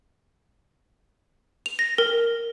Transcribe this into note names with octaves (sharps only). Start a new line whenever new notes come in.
F7
A#6
A#4